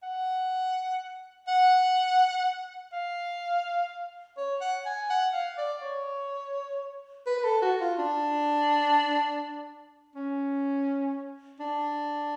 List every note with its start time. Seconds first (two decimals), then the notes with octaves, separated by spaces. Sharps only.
0.03 F#5
1.47 F#5
2.93 F5
4.37 C#5
4.61 F#5
4.86 G#5
5.10 F#5
5.33 F5
5.58 D5
5.82 C#5
7.27 B4
7.38 B4
7.44 A4
7.62 F#4
7.81 F4
7.99 D4
10.16 C#4
11.60 D4